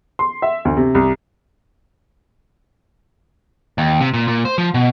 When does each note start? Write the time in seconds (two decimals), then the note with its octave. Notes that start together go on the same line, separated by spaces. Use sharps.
0.19 C6
0.42 E5
0.65 D2
0.77 C3
0.95 C2
3.78 D#2
4.01 C3
4.14 A#2
4.28 A#2
4.45 C5
4.58 F3
4.74 B2